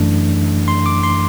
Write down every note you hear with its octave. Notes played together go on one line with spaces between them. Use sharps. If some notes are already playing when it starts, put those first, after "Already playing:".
Already playing: F#2 E3 A3 D4
C6
D6
C6